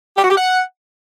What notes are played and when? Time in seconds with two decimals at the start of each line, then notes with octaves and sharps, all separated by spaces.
0.17 G4
0.24 F#4
0.30 G4
0.37 F#5